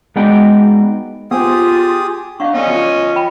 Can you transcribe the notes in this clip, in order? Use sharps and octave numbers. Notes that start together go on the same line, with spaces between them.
G#3 B3 D#4 F#4 D5 G5
B3 F4 G4 G#4 C5 D#6
D4 D#5 F5 F#5 C#6
B3 C#4 A4 D5 D#5
E3 F4
G5 B5